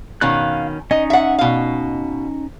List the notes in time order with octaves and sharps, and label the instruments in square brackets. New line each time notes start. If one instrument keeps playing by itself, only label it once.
[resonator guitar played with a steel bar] B2 D#3 C#4 [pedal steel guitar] F5 F#6
[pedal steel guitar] C#4 D#4 [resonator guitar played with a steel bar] D#5
[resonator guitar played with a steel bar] E5 F#5
B2 F5